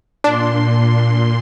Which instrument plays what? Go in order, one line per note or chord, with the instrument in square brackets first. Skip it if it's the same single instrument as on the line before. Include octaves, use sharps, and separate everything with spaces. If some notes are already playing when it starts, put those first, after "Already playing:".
[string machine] A#2 C6 [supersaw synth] D4